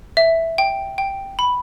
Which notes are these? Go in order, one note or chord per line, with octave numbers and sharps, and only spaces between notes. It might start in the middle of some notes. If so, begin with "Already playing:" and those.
E5
G5
G5
B5